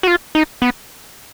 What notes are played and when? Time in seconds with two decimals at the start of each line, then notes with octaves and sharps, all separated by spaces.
0.03 F#4
0.08 F4
0.35 D#4
0.62 B3